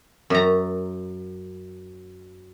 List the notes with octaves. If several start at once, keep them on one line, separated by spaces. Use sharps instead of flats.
F#2 A#5